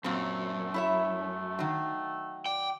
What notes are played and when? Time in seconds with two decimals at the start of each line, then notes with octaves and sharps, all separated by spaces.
0.04 F#2 A#2 A3 C4
0.74 E4 C#5 E5
1.59 D#3 F#3
2.46 D5 G5